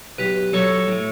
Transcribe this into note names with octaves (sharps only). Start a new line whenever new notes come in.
B1 G4 B4
F#3 A4 C#5
A2